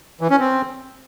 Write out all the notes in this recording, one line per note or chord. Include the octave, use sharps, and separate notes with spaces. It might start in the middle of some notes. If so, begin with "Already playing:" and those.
E3
C#4
C4